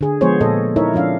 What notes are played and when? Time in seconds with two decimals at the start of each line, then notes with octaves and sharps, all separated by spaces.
0.01 D3 G#4
0.21 F3 G#3 B3 G#4 C5 C#5
0.41 A#2 A4 D#5
0.76 D#4 E4 A#4 C#5 E5
0.94 F3 C#4 D4 F5